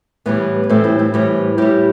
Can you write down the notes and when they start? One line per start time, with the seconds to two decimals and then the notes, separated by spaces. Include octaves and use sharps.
0.26 A2 E3 G3 B3
0.64 B3
0.70 A2 E3 G3 A3 C4
0.84 C4 E4
0.99 C4 E4
1.14 A2 E3 G3
1.58 A2 G3 E4 G4